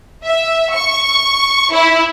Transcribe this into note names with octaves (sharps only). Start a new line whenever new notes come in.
E5
C#6
E4